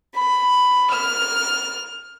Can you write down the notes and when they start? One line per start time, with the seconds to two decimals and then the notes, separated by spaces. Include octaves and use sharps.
0.15 B5
0.90 F6